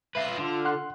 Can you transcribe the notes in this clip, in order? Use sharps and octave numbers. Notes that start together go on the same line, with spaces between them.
F4 B4 E5 A#6 C7
D3 F4 A4 F6
F#5 C6 F#6